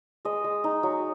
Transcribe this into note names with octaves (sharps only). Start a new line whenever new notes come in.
G#3 D#5
G#3
D#4
F#3